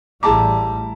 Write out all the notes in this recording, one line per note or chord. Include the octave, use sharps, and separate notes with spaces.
A1 G3 E4 G#4 A5 A#5 D6